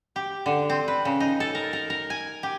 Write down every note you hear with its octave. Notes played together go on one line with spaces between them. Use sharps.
G4
D3
C4
B4
C#3
D#4
A4
A#4
A#4
A#4
G#5
G4